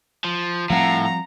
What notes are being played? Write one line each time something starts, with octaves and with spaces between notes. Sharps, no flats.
F3
A2 F3 G3 C4 F5 F#5 A#5